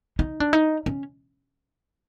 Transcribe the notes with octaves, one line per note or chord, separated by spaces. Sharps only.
D#4
D4
D#4
C#4